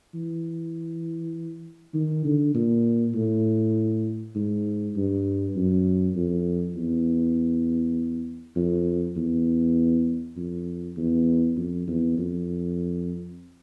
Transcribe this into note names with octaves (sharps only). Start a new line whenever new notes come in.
E3
D#3
D3
A#2
A2
G#2
G2
F#2
F2
E2
F2
E2
F2
E2
F2
E2
F2